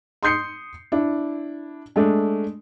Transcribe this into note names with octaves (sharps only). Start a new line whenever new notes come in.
C6 D#6 G6 C7 C#7
D4 E4
G#3 A3 D4